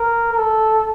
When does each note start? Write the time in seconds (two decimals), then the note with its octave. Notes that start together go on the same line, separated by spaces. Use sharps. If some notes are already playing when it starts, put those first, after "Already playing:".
Already playing: A#4
0.32 A#4
0.38 A4